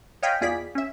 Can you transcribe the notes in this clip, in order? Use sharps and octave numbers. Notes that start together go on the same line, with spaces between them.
C#5 D#5 F5 G5 G#5 B5
E2 F4 G#4 D5 B5 B6
C#4 E5